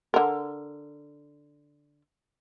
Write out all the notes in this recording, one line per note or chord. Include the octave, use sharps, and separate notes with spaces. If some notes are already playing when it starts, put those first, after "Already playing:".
D3 A#4